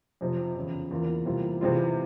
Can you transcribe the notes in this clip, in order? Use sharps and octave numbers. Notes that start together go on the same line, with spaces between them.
F2 C3 F3
E2 C#3 F3
E2 E3 A#3 F4 A#4
C3 E3 G3 A#3 F4
C3 E3 G#3 C4 F4